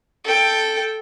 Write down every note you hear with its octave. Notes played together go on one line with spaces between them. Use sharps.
A4 G5